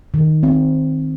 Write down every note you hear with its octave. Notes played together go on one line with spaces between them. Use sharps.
D#3
C4